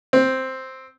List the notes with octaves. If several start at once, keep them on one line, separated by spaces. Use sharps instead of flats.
C4